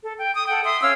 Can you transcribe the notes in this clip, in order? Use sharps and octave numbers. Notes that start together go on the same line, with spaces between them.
A4
G5
D#6
A4 F#5 G5
E5 C6 D#6
C#4 F5 E6